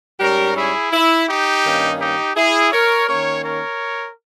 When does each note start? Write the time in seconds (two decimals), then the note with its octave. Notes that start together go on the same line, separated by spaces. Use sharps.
0.20 G#2 G3 C#4 G4 A#4
0.56 E4 G#4
0.92 E4
1.28 D#4 G4
1.64 G2 D#3 A#3 C#4
2.00 D#4 G4
2.36 E4 G#4
2.72 A#4 C#5
3.08 D#3 A#3 C#4 A#4 C#5
3.44 A#4 C#5